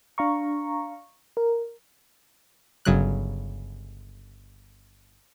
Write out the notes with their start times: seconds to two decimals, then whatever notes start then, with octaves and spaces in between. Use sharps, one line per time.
0.18 D4 F5 A#5 C#6
1.37 A#4
2.85 G1 C#3 F#3 F#6